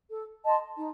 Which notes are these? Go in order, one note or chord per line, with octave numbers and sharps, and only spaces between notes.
A4
D#5 A5 C6
D#4